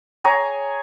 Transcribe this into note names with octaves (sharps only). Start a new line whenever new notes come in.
G#4 C#5 G#5 A#5